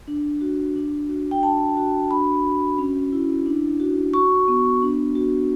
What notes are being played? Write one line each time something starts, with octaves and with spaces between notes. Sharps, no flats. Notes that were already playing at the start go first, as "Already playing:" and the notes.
D4
F#4
D4
F#4
G5
D4 A5
F#4
D4 B5
F#4
C#4
E4
D4
F#4
F#4 C#6
B3
D4
F#4